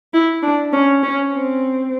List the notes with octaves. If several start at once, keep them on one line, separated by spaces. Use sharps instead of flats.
E4
D4
C#4
C#4
C4